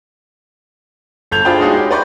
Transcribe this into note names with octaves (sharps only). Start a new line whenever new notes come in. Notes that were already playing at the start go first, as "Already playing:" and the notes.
G1 A4 G6 G#6 F7
D4 F4 G#4 C5 G5 B5
G#3 D#4 F#4 G#4 C#5 G#5
G4
B4 D5 A#5 C6 C#6 G6